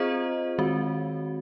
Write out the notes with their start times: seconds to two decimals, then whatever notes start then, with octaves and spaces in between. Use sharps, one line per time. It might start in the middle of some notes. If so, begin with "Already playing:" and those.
Already playing: C4 F4 G#4 C5 D#5
0.58 D#3 G#3 C4 F#4